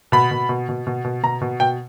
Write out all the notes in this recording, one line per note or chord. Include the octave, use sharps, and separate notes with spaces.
B2 B5
B2
B2
B2
B2
B2
B2 A#5
B2
B2 G5